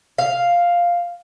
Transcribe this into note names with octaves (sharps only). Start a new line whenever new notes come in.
F5